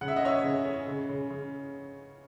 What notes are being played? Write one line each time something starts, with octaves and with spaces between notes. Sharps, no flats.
C#3 F#5
E5
D#5
C#4 C#5 E5
C#3
C#4
C#3
C#3
C#3